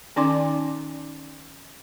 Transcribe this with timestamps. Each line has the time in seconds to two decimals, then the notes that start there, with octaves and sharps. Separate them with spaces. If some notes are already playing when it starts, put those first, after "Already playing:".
0.16 D#3 C#4 D#4 D5 C6 D6